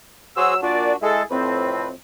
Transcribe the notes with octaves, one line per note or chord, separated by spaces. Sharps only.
F#3 F#4 G#4 C5 E6
A#2 D4 F#4 D5
G#3 E4 G#4 A4
F2 A2 C4 B4